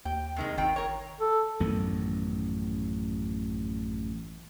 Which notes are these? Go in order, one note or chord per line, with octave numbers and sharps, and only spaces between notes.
D#2 G5
C3 D#3 G#3
G#1 D#3 C4 G5
A#4 C#5
A4
A1 F#2 D#3 B3